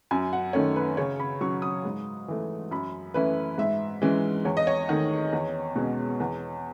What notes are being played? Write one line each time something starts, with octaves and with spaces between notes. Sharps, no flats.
F#2 G#5
F#5
D#3 A3 C#4 C#5
B4
C#3 C#5
B5
F#3 C#4 C#6
D#6
G#2
E3 A3
F#2 B5
E3 A3 C#4 E4 B4
G#2 E5
E3 G#3 C#4
E2 C#5
D#5
C#5
D#3 A3
E2
B2 G#3 C#4
E2